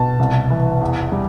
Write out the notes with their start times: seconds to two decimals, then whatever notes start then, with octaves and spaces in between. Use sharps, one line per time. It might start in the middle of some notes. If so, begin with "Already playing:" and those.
Already playing: B2 A5
0.19 C2
0.50 E3
0.81 E2
1.12 G3